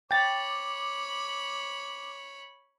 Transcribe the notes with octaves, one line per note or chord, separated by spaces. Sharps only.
C#5 G5 B5 D6 A6